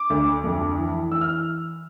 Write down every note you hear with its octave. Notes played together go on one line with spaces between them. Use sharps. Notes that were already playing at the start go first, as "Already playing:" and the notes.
Already playing: D6
D2
F2
E3
E3 E6
F6